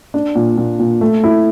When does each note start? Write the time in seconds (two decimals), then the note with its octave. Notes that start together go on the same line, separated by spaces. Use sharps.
0.14 D4
0.35 A#2
0.58 A#2
0.79 A#2
1.01 A3
1.24 E4